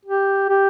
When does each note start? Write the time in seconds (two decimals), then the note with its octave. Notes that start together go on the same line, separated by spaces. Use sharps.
0.05 G4
0.49 G4